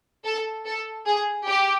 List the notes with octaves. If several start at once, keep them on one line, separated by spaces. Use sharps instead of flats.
A4
A4
G#4
G4